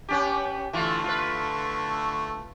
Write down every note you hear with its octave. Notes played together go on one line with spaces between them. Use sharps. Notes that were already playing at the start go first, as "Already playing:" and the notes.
B3 C#4 G4
D3 E3 A3 F4 C#6
F4 B4